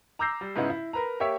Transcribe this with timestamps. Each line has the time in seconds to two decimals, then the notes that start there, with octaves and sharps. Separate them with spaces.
0.19 A#5 D6 E6 G6 A#6 C7
0.41 G3
0.56 G#2 C#3 B3 D#4 E4
0.70 E4
0.93 A#4 B4 A#5
1.20 A#3 G4 C#5 E5